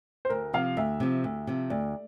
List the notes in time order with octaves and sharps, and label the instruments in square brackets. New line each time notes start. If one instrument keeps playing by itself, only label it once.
[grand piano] C5
[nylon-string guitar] D2 [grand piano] A#4
[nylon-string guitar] C3 F3 [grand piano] F5
[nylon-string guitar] D2 [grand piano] E5
[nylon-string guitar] C3 F3
D2
C3 F3
[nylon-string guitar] D2 [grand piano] D5